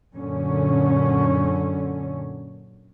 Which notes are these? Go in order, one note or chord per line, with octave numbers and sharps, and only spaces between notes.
F#2 A#2 D3 C#4